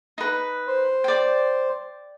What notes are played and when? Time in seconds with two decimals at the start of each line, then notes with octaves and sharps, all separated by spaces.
0.18 D#4 B4
0.68 C5
1.04 D5 G5